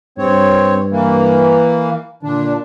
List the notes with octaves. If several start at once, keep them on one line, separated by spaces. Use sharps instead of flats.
G2 C4 C#5
E3 A#3
A#2 D3 D4